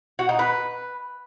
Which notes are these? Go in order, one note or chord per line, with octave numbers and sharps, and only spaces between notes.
F#4
D#4
B4